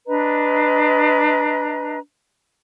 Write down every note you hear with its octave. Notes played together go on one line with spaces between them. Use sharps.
D4 B4 D#5 A#5